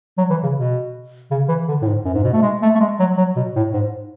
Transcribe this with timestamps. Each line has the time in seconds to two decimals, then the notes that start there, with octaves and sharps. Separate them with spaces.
0.18 F#3
0.30 E3
0.43 C#3
0.56 B2
1.31 C#3
1.48 E3
1.68 D3
1.82 A2
1.87 G#2
2.05 F#2
2.14 G#2
2.24 B2
2.33 A3
2.42 G#3
2.62 A3
2.75 A3
2.80 G#3
2.99 F#3
3.18 F#3
3.36 B2
3.56 A2
3.74 G#2